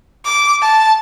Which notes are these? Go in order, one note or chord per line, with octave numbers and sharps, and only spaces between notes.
D6
A5